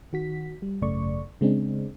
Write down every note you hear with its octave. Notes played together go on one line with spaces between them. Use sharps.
D#3 F#4 B6
G3
G#1 F#2 C#3 A3 D5 C#6
C#3 G#3 C4 D4